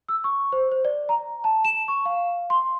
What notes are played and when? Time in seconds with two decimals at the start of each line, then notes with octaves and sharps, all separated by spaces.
0.09 E6
0.24 C#6
0.53 C5
0.72 C5
0.85 D5
1.09 A#5
1.44 A5
1.65 E7
1.88 C#6
2.05 F5
2.50 C6